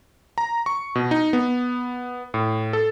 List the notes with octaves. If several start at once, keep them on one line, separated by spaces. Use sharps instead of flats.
A#5
C#6
B2
D#4
B3
A2
A4